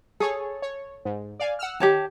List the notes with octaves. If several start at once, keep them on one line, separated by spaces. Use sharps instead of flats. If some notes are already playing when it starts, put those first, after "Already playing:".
G#4 A4 C#5
C#5
G#2
D5 F5 G#5
F#5 E6 F6
D#3 G4 C#5 A5